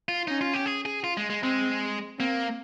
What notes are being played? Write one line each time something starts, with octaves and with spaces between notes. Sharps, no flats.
F4
C#4 D#4
F4
G4
G#4
G#4
F4
G#3
G#3
G#3 C4
A#3 C4